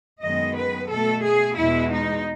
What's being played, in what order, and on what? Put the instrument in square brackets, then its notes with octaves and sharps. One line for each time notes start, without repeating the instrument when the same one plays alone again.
[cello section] F#2 D#3 G#3 B3 D#5
B4
B2 A3 A4
G#4
E2 B2 G#3 E4
D#4